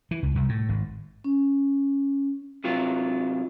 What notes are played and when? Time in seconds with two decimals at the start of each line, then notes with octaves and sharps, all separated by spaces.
0.11 E3
0.23 C#2
0.35 C2
0.49 A2
0.69 G#1
1.24 C#4
2.64 C3 F#3 F4